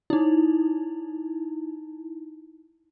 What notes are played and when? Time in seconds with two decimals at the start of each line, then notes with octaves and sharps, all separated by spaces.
0.10 D#4 E4